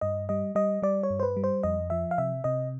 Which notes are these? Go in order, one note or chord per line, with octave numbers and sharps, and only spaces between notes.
G2 D#5
G3 D#5
G3 D#5
G3 D5
C#5
G2
C5
B4
G3
C5
F2 D#5
F3 E5
F5
C3 E5
C3 D#5